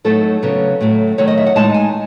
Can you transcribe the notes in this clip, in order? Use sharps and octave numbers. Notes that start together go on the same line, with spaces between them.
A2 F#3 A3 D#4 A4
C#3 F#3 B3
A2 F#3 A3
D#3 F#3 A3 D#4 C#5
D#5
E5
F#5
A2 G#3 D#4 A5
G#5